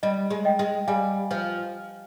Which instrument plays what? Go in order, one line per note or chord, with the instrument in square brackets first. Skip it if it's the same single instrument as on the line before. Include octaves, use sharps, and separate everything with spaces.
[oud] G3 [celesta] D#5
[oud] G#3
[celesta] D#5 G5
[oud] G#3
[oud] G3 [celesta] F5 G#5
[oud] F3